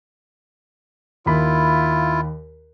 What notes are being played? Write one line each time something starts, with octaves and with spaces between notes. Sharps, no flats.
D#2 E4 F4 B5